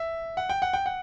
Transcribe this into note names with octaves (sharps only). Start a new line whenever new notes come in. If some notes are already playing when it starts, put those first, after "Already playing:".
Already playing: E5
F#5
G5
F#5
G5
F#5